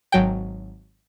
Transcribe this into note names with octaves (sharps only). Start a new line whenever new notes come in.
G#1 F#3 G5